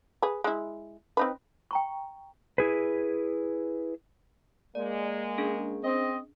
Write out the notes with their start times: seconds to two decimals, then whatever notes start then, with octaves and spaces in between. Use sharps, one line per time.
0.22 G#4 B4
0.44 G#3 E4
1.17 C4 D#4 B4
1.71 G5 A#5 C#6
2.58 E4 G#4 B4
4.75 G#3 A#3 D5
5.38 C#4 D4 G#4
5.84 C4 D#5